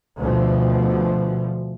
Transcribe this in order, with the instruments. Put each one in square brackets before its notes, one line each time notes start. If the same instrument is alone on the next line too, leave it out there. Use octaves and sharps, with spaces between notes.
[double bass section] D2 B2 F3